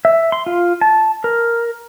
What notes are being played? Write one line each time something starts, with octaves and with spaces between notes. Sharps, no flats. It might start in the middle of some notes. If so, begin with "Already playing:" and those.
E5
C6
F4
A5
A#4